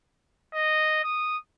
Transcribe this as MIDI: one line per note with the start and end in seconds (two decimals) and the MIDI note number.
0.54 1.01 75
1.04 1.37 87